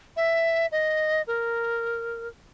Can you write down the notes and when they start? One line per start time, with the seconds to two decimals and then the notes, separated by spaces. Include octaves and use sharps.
0.16 E5
0.72 D#5
1.27 A#4